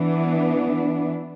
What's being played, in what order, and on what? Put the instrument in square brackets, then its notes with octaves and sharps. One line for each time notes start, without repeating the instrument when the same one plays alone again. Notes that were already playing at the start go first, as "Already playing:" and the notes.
Already playing: [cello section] E3 B3 D4